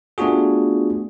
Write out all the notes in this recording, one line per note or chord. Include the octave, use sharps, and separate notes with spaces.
A3 B3 D4 F4 F#4 G#4